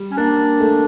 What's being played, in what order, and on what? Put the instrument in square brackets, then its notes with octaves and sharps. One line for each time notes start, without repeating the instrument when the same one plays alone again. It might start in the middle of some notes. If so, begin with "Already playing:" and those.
Already playing: [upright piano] G3
[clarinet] C#4
[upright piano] A#3 [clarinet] D4
[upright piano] A3